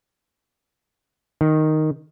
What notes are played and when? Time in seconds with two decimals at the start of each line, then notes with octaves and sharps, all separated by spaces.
1.41 D#3